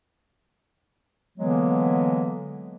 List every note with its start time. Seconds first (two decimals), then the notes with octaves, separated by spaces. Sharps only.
1.38 D3 E3 F#3 G#3 A#3 B3